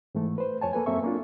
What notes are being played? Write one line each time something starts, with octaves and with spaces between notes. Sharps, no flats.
G#2 E3 A3
B4 C5
F2 C#5 G#5 A5
A#3 A4 B4 G#5
F#2 A#3 C4 A4 E5 C#6
A#3 C4 D4 F4